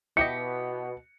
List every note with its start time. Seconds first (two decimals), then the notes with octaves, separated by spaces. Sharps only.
0.17 B2 E4 G4 D#5 C#7